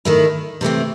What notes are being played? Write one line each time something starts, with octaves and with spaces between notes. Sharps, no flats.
D#3 A3 E4
C3 E3 A3 C4